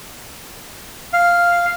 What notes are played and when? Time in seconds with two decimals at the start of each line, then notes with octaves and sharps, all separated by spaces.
1.13 F5